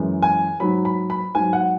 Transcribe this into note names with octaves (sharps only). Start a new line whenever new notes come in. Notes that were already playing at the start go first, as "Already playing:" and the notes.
Already playing: F#2 E3 G#3
G#5
G#2 F#3 B5
B5
B5
G#2 F#3 G#5
F#5